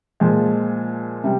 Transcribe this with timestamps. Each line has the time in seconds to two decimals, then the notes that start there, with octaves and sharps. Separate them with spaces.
0.20 A#2 F3 G#3
1.24 C3 G3